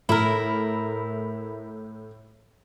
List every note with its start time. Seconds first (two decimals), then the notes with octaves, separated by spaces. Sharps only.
0.09 A2 E4 A#4